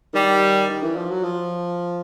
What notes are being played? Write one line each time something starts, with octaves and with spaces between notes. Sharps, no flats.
D#3 G3
D#3
E3
F3
F#3
F3